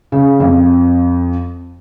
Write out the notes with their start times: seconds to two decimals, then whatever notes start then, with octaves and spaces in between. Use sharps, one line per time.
0.12 C#3
0.40 F2